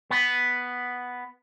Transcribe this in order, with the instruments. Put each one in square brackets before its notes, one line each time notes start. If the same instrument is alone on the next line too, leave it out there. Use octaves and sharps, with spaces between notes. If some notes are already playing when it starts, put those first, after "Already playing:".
[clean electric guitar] B3